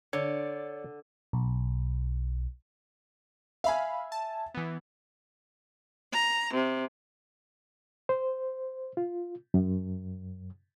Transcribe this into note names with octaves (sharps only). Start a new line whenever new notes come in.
D3 C#5 D5
B1
E5 F5 G#5 B5
A5
E3 B3
A#5
C3
C5
F4
F#2